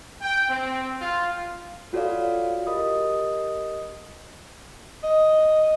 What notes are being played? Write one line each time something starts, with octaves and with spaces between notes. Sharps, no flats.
G5
C4
F4
F4 F#4 A4 C#5 D5 F5
G4 A#4 D#5 B5 D#6
D#5